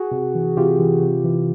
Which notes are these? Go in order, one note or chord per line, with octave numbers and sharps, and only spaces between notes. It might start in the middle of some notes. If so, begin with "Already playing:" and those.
Already playing: F#4 G#4
C3
E3
C3 F4 G4
E3
C3
E3